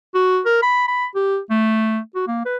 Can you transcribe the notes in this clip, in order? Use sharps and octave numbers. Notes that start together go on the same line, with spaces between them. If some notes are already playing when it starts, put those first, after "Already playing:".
F#4
A#4
B5
B5
G4
A3
F#4
A#3
B4